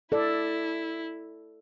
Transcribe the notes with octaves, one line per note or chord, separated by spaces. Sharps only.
E4 A4 D5